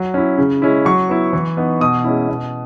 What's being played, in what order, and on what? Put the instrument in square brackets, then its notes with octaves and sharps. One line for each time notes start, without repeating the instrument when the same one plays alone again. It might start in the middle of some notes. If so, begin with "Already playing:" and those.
Already playing: [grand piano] F#3
C#4 E4
C#3
G#3 C#4 E4
F#3 C#6
B3 E4
E3
B3 D#4
B2 D#6
G#3 C#4 E4
B2